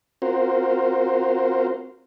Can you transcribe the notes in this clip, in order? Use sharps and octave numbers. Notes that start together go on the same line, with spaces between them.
C4 F4 F#4 A#4 C5